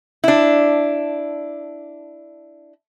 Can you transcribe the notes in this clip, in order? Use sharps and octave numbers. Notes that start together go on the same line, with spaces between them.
D4 E4